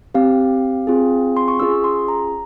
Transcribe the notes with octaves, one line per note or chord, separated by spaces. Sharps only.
C4 G4 F5
C4 F4 G#4
C6
C#6
C#4 F4 G#4 E6
C6
A#5